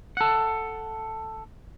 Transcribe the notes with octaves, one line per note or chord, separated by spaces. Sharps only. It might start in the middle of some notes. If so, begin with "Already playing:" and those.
A4 F#5